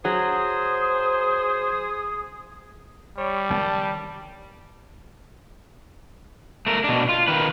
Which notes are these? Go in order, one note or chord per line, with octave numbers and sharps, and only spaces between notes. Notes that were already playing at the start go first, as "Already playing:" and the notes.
F#3 G#4 C5 D#6
G3 C#5
D#3 D4 A5
A3 A#4
B2 D4
F4
D#3 B4